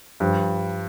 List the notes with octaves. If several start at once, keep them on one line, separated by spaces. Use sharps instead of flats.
G2 F3